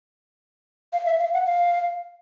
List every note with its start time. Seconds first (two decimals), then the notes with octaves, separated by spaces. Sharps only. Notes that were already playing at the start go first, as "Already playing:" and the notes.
0.93 F5
1.05 E5
1.20 F5
1.33 F#5
1.46 F5